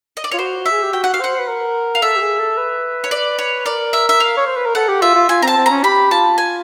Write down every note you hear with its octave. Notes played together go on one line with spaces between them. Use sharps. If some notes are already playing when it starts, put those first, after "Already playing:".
D#5
D5
F4 C#5
F#4 C5
E5
G#4
G4
F#4 G5
F#5
F5
C5 F#5
B4
A#4
F5
A4 E5
G4
G#4
A4
B4
C#5
D5
C#5
A#4 D5
E5
E5
F5
C#5
C5
B4
A#4
A4 F#5
G4
F4 E5
F4
F4 G#5
C4 A#5
A5
C4
C#4 A#5
G4 B5
F4 A5
G#5